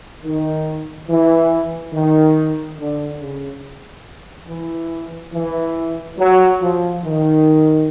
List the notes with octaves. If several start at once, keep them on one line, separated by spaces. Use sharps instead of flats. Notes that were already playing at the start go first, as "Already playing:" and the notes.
D#3
E3
D#3
D3
C#3
E3
E3
F#3
F3
D#3